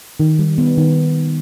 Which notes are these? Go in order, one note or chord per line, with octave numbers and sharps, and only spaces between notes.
D#3
G3
B3
D#3